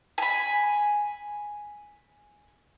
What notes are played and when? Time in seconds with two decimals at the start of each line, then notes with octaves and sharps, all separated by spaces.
0.18 G#5 B5